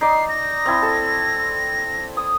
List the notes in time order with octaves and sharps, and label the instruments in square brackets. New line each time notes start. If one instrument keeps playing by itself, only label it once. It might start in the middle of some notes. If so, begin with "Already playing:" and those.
[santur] D#4 D5 [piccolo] C7
[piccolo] A#6
[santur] C4 E4
A4
D#6